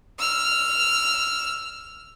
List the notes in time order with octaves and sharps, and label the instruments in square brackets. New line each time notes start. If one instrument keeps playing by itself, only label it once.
[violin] E6 F6